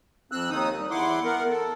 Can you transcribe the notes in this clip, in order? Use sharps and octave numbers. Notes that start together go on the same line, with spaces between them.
F2 C4 E6 F#6
D#2 D#3 D#4 D#6
G3
E2 E4 F#5 C6 D6
B3 A#4 F#5
A4